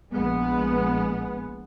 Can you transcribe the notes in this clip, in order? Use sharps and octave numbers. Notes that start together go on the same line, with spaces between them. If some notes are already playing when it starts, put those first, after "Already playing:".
A#1 G#3 B3